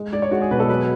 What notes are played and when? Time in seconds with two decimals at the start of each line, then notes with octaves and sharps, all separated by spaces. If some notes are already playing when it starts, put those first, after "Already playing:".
Already playing: G#3
0.13 G#3 D5
0.22 C#5
0.31 G#3 F#4
0.42 G#4
0.51 B2 B4
0.60 A4
0.69 F#3 B4